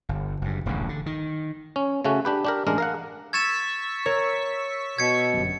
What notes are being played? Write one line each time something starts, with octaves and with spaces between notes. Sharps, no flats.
G1
F#1 G2
D#1 A1 G2 C#3
D3
D#3
C#4
C#3 A3 C#4 F#4
D4 G4 B4
D4 G4 A#4
A1 G#3 D4 A#4
A#4 F5 F#5
C#6 E6 G#6 A6 B6 E7
A#4 C#5
B2 G#6 C#7
G1 F#2